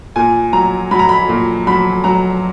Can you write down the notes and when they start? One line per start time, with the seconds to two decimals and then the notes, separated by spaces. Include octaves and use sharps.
0.16 A#2 G#5
0.53 F#3 A#5
0.91 F#3 B5
0.99 A#5
1.09 B5
1.29 A#2
1.67 F#3 B5
2.04 F#3 A#5